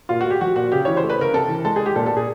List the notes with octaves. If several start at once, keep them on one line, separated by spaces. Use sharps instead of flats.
A#2 F4
A3 F#4
G4
F3 F#4
A#2 F#4
C#3 G4
E3 C#5
C5
A3
B4
C#3 A#4
C3 A4
E3
G#3 A4
G#4
G#3
G4
A#2 A4
A4
A#2
G#4